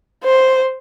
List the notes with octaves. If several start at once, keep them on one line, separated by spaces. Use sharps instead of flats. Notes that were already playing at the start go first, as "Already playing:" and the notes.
C5